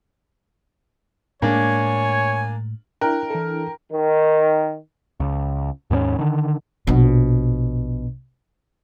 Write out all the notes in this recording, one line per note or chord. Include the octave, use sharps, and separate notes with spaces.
A2 G#3 A#3 D4 C#5 G#5
D4 E4 A#4 G5 A#5 F#6
E3 A4
D#3
C#2
D#2 G#2 B3 C#4
D3 D#3
A#1 B2